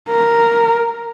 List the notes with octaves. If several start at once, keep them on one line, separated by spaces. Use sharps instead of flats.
A#4